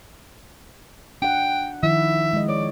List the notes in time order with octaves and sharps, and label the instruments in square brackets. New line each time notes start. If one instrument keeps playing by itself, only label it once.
[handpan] D4 F#5 [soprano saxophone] G5
[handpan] D#3 F3 E4 [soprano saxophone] E5
[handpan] G#3 D#5
[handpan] C#5 [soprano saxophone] D5